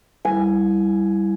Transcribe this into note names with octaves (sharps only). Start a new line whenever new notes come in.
G3 E4 G#5